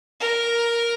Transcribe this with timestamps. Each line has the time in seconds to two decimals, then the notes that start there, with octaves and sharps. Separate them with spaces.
0.20 A#4